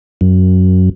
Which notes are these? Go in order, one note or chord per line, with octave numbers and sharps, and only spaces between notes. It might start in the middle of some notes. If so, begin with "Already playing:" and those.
F#2